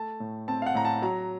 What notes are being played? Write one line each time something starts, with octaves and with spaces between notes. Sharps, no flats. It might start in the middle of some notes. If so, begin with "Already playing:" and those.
Already playing: A3 A5
A2
C4 A5
F5
F#5
A2 A#5
A5
F#3 A#5